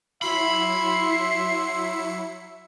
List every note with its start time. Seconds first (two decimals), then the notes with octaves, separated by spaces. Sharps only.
0.22 F#3 E4 E5 B5 C6 C#7